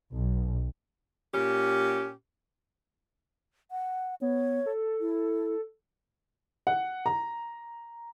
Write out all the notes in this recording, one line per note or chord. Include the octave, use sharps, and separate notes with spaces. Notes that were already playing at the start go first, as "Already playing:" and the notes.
B1
A#2 C#4 G4
F#5
B3 C#5
A4
E4
F#5
A#5